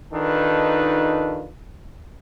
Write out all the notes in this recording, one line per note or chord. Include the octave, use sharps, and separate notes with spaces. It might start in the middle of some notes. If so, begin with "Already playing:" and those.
D#3 D4 D#4 F4 A4 B4